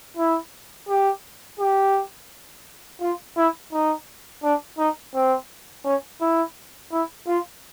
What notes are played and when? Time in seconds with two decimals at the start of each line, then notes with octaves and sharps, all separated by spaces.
0.17 E4
0.88 G4
1.59 G4
3.01 F4
3.37 E4
3.73 D#4
4.43 D4
4.78 D#4
5.14 C4
5.85 C#4
6.21 E4
6.92 E4
7.27 F4